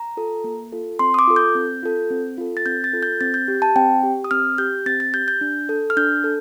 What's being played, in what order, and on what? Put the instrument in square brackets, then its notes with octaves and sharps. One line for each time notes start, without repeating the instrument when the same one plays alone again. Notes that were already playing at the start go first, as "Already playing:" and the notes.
Already playing: [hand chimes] A#5
F4 A4
A#3
F4 A4
C4 C6
D#6
D6
F4 A4
G6
C4
F4 A4
C4
F4 A4
A6
C4 G6
A6
F4 A4
G6
C4 A6
G6
G4
A5
C4 G5
G4
D#6
C4 F6
G4 G6
C4 A6
A6
G4 G6
G6
D4
A4
F6
D4 G6
A4